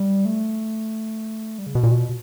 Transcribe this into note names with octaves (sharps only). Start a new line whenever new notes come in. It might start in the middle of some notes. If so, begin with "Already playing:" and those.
Already playing: G3
A3
G3
C#3
B2
A#2
B2